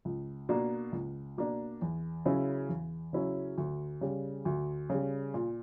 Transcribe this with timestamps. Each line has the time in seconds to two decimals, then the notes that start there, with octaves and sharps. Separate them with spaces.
0.05 C#2
0.49 B2 A#3 D4
0.92 C#2
1.38 B2 A#3 D4
1.82 E2
2.25 C#3 F#3 C#4 E4
2.69 E2
3.13 C#3 F#3 C#4 E4
3.58 D2
4.01 C#3 G3
4.45 D2
4.90 C#3 G3
5.34 A#2